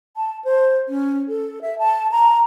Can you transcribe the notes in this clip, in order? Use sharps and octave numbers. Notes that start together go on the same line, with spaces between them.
A5
C5
C#4
A4
E5
A5
A#5